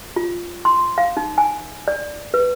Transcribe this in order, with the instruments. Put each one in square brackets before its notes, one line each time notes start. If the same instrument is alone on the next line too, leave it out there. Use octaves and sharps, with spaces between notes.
[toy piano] F4
C6
F5
D#4
G#5
D5
B4